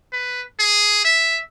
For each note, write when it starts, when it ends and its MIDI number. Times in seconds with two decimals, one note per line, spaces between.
0.13 0.43 71
0.59 1.01 68
1.05 1.40 76